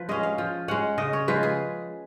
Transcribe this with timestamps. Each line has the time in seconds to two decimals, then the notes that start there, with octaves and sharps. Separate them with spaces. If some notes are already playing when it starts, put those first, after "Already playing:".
Already playing: F3 B4
0.09 G#3 C#4 D#5
0.23 F5
0.38 F3
0.68 G#3 C#4 F#5
0.98 C#3 D#5
1.13 C#5
1.28 F3 G#3 B4
1.43 G#4